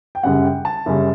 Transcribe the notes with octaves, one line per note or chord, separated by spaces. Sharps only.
G5
F#2 C#3 G3 C#4 F#5
G5
A5
F#2 C#3 G3 C#4